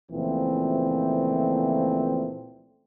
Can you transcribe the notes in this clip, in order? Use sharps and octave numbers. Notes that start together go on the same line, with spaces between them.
C#2 A#2 E3 F3 A3 C4